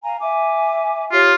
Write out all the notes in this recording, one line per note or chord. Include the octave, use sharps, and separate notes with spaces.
F5 G#5 A#5
E5 G#5 D6
F4 G4 C#5